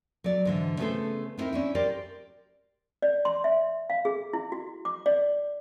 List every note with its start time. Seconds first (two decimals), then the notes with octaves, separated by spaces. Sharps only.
0.24 F#3 D5
0.45 G#2 D3 E3
0.78 C#3 A3 B3 G#4 A4 C5
1.38 B3 C4 D#4 E4 A#4
1.53 C#4 D4 E4
1.75 G4 A#4 C5 D5
3.02 D5
3.25 C6
3.44 E5
3.90 F5
4.05 G#4
4.33 E4
4.52 F#4
4.85 D6
5.06 D5